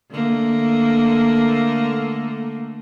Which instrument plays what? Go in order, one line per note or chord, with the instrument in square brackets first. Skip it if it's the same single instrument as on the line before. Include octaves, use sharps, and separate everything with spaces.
[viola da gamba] D3 A3 A#3